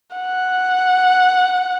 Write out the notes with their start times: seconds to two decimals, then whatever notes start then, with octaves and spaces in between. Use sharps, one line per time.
0.16 F#5